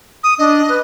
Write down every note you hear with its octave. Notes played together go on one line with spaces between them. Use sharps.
D#6
D4 D#5
B4